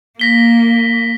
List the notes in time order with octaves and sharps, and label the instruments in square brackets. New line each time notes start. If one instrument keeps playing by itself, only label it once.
[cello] A#3 [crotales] A#6 B6 G7